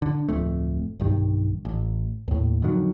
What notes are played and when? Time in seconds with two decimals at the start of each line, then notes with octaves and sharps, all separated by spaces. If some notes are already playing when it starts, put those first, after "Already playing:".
0.02 D3
0.28 D1 F2 A3
1.00 B1 G2 D#3
1.65 A1
2.28 D#2 A2
2.62 F2 D3 D#3 F#3